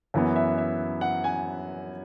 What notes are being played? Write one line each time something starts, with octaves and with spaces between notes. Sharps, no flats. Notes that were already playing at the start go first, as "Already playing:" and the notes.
F#2 E3 B3
E5
E5
F#5
G#5